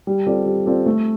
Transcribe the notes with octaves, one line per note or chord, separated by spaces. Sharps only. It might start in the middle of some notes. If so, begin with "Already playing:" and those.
G3
C4 F4 A4 D5
G3
C4 F4 A4 D5
A3